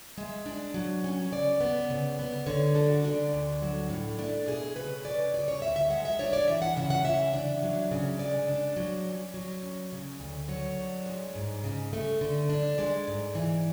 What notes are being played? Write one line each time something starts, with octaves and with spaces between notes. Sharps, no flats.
G#3 E5
D4
F#3
C#4
C#3 D5
B3
C#3
B3
D3 C#5
D4 A4
F#4
D3 D4
D2
F#3
A2
A3 D4
B2 G#4
C#3 B4
C#4 D5
C#3 D5
C#5
D2 E5
E5
G#3 F#5
E5
D4 C#5
D5
E3 E5
F#5
C#3 E5
F#5
E3 E5
D4
F#3
C#3
G#3 D5
D4
F#3
C#4
F#3
C#4
C#3
D2
F#3 C#5
D4
G#3
G#2
C#3
A3
D3
D4
G#3 D5
G#2
E3